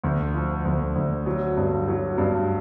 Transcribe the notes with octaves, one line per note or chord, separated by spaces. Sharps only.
D2
F3
D2
D2
F#3
G2
F#3
G2